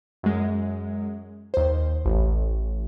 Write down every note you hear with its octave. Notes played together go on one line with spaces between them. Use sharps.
F#2 G#3
D#2 C5
A1